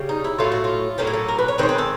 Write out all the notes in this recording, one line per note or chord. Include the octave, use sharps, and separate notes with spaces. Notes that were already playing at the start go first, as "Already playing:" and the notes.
Already playing: C#3 G3
D#4
E4
A2 F#3 A3 F4
F#4
F4
A2 F#3 A#3 C#4 G4
G#4
A4
A#4
B4
C#5
D#3 G#3 C4 B4 C5
B4
A4